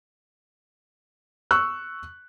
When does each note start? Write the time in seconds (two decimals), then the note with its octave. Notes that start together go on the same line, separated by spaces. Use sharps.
1.51 C#6 E6 F#6